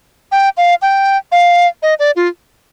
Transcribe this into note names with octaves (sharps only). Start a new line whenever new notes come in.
G5
F5
G5
F5
D#5
D5
F4